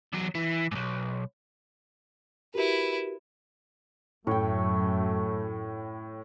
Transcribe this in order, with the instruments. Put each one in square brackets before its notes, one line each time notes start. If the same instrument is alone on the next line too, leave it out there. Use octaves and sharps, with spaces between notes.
[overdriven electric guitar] E2 F#3
E3
B1 G#2
[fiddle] E4 B4 [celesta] F#4 G4 A#4
[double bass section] F#2 [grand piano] A2 [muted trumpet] A3 [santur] C#5 G5